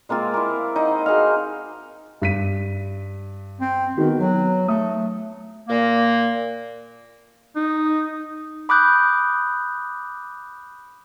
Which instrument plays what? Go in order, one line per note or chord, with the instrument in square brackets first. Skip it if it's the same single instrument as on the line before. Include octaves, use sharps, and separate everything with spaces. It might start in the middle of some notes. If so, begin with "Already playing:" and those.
[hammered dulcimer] G#3 A#3 C4 F4
A#3 E4
D#4 C5 D#5 F#5
F#4 G#4 D#5 F5
[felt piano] G2 B6 D#7
[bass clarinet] C4
[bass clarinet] D#3 [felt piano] B3 D#4 F#4
[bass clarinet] F#3 [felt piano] B3
[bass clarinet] A3 [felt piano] D#6
[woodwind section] A#2 A#3
[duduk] D#4
[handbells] B5 D6 D#6 F#6 G6